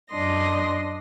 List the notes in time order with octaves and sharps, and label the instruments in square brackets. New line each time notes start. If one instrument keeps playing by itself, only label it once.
[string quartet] F#2 D4 D#5 C6 A#6